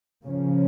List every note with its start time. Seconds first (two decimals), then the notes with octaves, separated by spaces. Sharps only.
0.24 C#3 F3 A#3 C#4